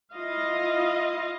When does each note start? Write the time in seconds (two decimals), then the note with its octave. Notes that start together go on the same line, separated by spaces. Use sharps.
0.14 E4 F4 D#5 F5